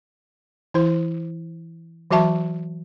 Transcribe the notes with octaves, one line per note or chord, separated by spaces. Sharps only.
E3 E4 C5
E3 F#3 F#4 E5 A5 C#6